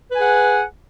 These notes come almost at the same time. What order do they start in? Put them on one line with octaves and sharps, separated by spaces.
B4 G#5 G#4 F#5